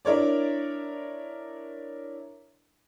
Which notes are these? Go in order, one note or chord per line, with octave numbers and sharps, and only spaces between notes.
D4 E4 A#4 C#5 D5